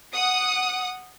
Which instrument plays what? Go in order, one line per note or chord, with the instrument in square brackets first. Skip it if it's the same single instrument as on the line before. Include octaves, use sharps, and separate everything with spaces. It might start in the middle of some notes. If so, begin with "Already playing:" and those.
[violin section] F#5 D#6